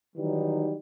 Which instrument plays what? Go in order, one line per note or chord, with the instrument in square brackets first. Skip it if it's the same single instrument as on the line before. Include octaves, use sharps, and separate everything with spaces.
[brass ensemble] D#3 E3 F#3 G3 D#4